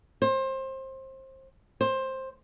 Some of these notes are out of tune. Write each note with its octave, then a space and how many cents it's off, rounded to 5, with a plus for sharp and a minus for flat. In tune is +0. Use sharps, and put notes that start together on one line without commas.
C5 +25
C5 +15